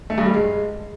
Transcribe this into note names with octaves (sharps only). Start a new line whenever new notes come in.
A3
G2
G3
G#3